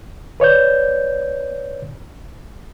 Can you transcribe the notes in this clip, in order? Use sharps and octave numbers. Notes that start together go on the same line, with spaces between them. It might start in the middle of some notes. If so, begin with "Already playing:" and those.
B4 C#5 D5 G6